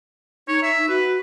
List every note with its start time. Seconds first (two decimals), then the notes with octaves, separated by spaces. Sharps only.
0.48 D#4 C#5
0.63 E5
0.89 F#4 B4